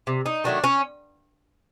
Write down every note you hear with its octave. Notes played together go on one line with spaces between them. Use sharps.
C3
D#4
D#3 F#3 A3 D4
C#4